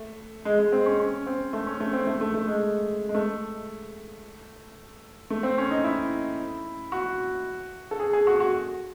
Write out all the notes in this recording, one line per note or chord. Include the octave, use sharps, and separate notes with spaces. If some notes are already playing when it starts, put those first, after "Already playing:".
Already playing: A3
G#3
G#3
C4
C#4
C#4
C4
A3
C#4
A3
C4
A3
A3
A3
G#3
G#3
A3
A3
C4
C#4
D#4
E4
F#4
A4
G#4
G#4
F#4
F#4